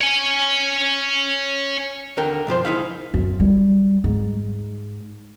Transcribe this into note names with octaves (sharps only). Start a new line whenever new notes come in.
C#5 G#5
D#2 D3 A#4 G5
B1 F#2 F3 C5
C#2 D#4 E4 F5
F#2
G3
G#2